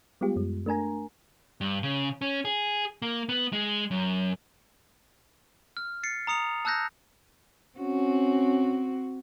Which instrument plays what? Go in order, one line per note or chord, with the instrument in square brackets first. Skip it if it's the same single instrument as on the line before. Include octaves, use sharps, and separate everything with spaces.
[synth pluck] G3 G#3 B3 F4 G4
F#2 G#3
A3 D4 A#4 G#5 A#5
[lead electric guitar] G2
C#3
C#4
G#4
A#3
B3
G#3
F#2
[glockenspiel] F6
A6 C7 C#7
A#5 D#6 C#7 F7
A5 E6 F#6 G6 A#6
[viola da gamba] C4 F#4 [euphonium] C#4